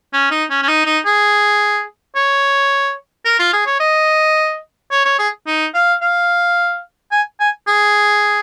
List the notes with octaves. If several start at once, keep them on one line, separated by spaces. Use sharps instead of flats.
C#4
D#4
C#4
C#4
D#4
D#4
G#4
C#5
A#4
F4
G#4
C#5
D#5
C#5
C#5
G#4
D#4
F5
F5
G#5
G#5
G#4